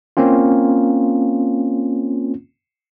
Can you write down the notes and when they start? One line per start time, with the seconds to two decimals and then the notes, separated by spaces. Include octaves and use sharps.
0.17 A#3 C4 C#4 F4